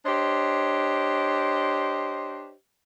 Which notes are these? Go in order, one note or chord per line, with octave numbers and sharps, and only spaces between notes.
D4 G4 C5 C#5 D#5